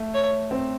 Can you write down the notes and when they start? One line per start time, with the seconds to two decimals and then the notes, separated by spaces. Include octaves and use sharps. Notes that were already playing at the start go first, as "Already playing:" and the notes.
Already playing: A3
0.14 C#5
0.51 C4